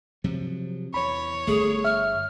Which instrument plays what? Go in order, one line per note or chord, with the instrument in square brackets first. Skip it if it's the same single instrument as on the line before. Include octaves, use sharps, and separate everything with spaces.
[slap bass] C3 F3 F#3
[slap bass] E2 [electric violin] C#5 [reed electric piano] B5
[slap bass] G1 [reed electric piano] A3 [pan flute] G#4
[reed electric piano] E5 [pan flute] F6